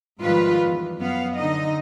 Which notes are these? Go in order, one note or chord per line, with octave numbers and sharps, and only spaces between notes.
G#2 D#3 F3 G3 F4 B4
E2
F#2 B3 F5
D3 D#4 D#5